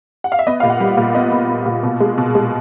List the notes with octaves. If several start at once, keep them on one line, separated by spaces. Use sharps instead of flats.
F#5
F5
E5
B3 D#5
A#2 F5
F#5
G3
A#2
B3 D#5
B3
B3
A#2
B2
G#3
B2
G#3